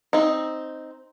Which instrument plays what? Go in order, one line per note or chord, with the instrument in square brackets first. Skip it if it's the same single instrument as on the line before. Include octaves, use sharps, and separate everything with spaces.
[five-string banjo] C4 D#4